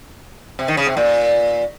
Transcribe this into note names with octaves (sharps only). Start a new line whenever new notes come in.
C3
D#3
C#3
C3
A#2